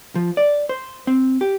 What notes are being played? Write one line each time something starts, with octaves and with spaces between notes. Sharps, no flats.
F3
D5
C5
C4
G4